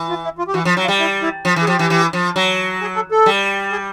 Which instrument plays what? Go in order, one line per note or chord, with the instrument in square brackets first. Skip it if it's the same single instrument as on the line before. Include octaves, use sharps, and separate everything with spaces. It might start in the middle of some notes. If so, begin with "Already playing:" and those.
Already playing: [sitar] E3
[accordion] F4
E4
F4
G4
[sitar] E3 [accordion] F#4
[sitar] F3
F#3
[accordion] F4
[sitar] G3
[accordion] E4
E4
[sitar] F3
E3
[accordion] G#4
[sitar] F3 [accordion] G4
[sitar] E3
E3
F3
F#3
[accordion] G#4
A4
A4
[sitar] G3
[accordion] G#4